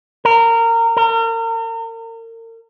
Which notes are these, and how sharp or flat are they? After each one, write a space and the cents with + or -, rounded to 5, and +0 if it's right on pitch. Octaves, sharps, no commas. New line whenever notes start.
A#4 -20
A#4 -35